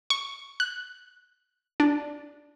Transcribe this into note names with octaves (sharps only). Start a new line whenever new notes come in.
C#6
F#6
D4